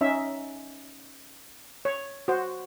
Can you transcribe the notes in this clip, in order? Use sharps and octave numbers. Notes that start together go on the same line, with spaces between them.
C#4 D#4 E5
C#5
F#4 C5